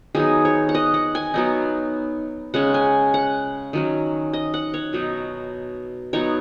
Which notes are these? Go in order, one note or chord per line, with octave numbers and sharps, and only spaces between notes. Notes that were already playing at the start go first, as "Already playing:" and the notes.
D#3 F#3 B3 D#4 G#4
C#5
F#5
D#5
F#5
G#5
F#3 B3 D#4
C#3 G#3 C#4 F#5
G#5
F#5
D#3 F#3 C#4
D#5
F#5
C#5
B2 F#3 D#4
F#3 B3 D#4 C#5